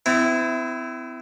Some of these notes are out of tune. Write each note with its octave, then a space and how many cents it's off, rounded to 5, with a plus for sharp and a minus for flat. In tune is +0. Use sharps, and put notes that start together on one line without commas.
C4 -45 E4 +0